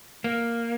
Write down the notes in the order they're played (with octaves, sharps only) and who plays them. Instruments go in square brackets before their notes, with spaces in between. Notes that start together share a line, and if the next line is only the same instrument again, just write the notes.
[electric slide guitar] A#3